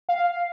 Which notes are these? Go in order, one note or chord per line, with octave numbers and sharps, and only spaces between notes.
F5